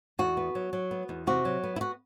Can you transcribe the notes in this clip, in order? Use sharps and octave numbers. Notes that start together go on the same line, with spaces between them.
E2 F#4
B3
F#3
F#3
B3
E2
C3 F#4
F#3
B3
E4
F#4